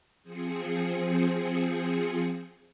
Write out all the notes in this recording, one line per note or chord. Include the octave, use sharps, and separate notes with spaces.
F3 C4 G#4 C#7